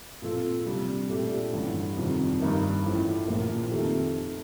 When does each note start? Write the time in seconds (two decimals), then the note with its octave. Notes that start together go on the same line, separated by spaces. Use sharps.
0.22 A#2 F3 C4 F4 A4
0.66 C3 G3 D4
1.09 A#2 A3 D4 G4
1.53 A1 G2 D3
1.97 F2 C3 D#3 G3
2.40 G2 D#3 A#3 D#4 A#4
2.84 A1 A2 F3
3.28 A#1 A#2 F3 A#3
3.71 F2 D#3 A3 C4 G4